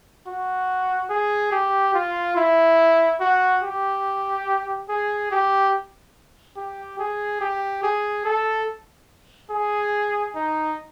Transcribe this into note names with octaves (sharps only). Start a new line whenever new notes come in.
F#4
G#4
G4
F4
E4
F#4
G4
G#4
G4
G4
G#4
G4
G#4
A4
G#4
D#4